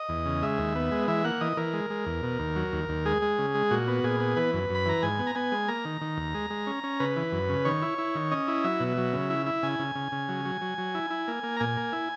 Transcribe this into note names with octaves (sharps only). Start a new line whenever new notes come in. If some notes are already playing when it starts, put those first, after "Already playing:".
Already playing: D#5
E2
C#3
G#3 E5
D#2
B3
G#3
E3 E5
A#3 F#5
E3 D#5
E3 A#4
G#3
G#3
E2
B2
D#2
F#3
D#2
D#2
G#3 G#4
G#3
C#3
G#3
A#2 F#4
B3
A#2 G#4
B3
E3 B4
F#2
F#2
B5
E3 A#5
G#2 G#5
B3
A#5
B3 G#5
G#3
A#3 A#5
D#3
D#3
D#2
G#3
G#3
C#4
C#4
C#3 B4
E3
F#2
C#3
D#3 C#5
E4
E4
D#3
C#4 D#5
E4
F#3 E5
B2
F#3
C#3
E4
E4
C#3 G#5
C#3
C#3
C#3
F#3
F#3
F#3
F#3
E4
E4
A#3
A#3
A#5
A#2 G#5
A#3
E4